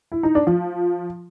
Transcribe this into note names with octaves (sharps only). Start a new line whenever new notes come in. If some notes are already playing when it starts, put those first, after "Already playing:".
E4
D#4
D4
F3